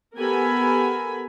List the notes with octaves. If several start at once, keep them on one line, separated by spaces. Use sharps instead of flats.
B3 G4 A4 A#4 G#5 B5